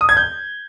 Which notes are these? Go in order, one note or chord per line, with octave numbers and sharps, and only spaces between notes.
D#6
G#6
G6